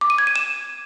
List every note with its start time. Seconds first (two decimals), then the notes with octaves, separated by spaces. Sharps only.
0.01 D6
0.10 D#7
0.18 G#6
0.27 D#7
0.36 E7